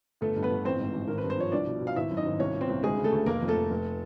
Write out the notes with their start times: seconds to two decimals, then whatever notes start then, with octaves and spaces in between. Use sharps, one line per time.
0.21 G1 A3 A4
0.36 G2
0.43 B3 B4
0.50 G1
0.65 A1 C4 C5
0.80 G#2
0.94 A1
1.08 G#1 A#4
1.18 G2 B4
1.30 C5
1.38 F3 C#5
1.52 C2 D4 D5
1.67 B2
1.81 B2
1.87 F5
1.95 G#1 E4 E5
2.10 F#2
2.17 D#4 D#5
2.26 G#1
2.39 C2 C#4 C#5
2.55 A#2
2.61 C4 C5
2.69 C2
2.83 D2 G#3 G#4
2.97 C#3
3.04 A3 A4
3.12 D2
3.26 F1 A#3 A#4
3.42 F2
3.48 A3 A4
3.56 F1
3.71 F1